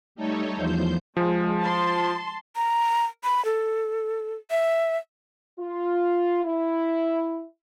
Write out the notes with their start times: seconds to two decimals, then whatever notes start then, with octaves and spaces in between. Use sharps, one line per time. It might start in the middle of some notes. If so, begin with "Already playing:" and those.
0.15 G3 A3 D#4 A4 C#5
0.55 E2 F3 C5 G6
1.17 F3 G#3
1.60 A5 C6
2.56 A#5
3.24 B5
3.45 A4
4.51 E5
5.58 F4
6.43 E4